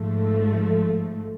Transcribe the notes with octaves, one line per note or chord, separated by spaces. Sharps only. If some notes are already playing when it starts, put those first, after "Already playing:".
Already playing: G#1 G#2 F3 A3